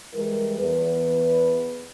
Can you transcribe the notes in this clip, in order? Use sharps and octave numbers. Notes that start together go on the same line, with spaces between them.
E3 G3 G#3 A#4
E2 B4